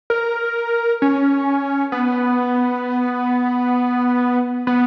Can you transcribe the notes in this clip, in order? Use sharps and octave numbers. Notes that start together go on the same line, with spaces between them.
A#4
C#4
B3
B3